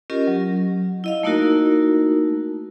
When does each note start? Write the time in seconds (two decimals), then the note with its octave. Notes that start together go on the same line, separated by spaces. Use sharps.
0.10 C#4 F4 G4 A#4 D#5
0.27 F#3
1.04 E4 D#5 F5
1.23 A3 A#3 D#4 E4 F#4 A#4